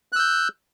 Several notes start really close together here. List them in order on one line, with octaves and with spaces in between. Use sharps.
F#6 E6 G6